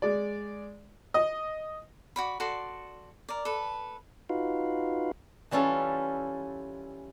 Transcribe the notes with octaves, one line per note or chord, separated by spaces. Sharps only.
G#3 D5
D#5
F#4 D5 B5
F#4 A4 D5 C6
A#4 D5
A4 B4
D#4 F4 F#4 B4 F5
E3 G3 C#4 F4 A4